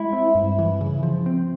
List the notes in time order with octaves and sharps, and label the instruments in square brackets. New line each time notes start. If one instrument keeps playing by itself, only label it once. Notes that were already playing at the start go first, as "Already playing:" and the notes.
Already playing: [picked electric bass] G#3 [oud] E4
[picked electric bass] C4
G2
E3
C#3
F3
C4